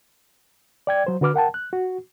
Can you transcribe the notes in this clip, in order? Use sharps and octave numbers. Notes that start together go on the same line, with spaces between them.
D5 G5 G#6
F#3 C5
D3 F#4 B4 D6 F6
A#4 F#5 G5 A5
F#6
F#4